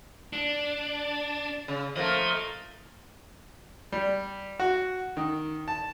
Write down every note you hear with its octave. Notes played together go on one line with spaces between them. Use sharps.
D4
C#3
F3 A3 A#3 D#5
G3
F#4
D#3
A5